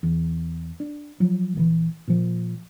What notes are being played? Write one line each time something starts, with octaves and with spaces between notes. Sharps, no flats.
E2
D4
F3 F#3
A#1 D#3 E3
A#2 F3